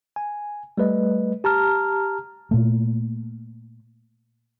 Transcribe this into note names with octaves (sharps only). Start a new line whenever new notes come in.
G#5
G3 A3 B4 D#5
G4 A5 A#5 F6
A#2 A3